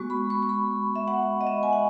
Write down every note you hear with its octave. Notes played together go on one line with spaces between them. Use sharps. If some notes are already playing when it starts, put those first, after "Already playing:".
Already playing: G#3 B3 F#4 C#6
B5
C#6
C#6
B5
E5
F#5
D#5
E5
G#5
F#5